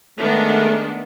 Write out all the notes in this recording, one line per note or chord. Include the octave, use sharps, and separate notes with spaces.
D#3 G#3 A3 B3 D4